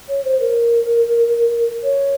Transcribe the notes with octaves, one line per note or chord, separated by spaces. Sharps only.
C#5
C5
A#4
C#5